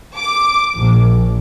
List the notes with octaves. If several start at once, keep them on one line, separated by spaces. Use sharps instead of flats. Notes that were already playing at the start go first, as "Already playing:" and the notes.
D6
A#1